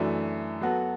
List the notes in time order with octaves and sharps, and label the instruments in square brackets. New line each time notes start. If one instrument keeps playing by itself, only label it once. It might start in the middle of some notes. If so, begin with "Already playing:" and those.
Already playing: [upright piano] F#2 E3 A3 D4
F#3 B3 F#4 A4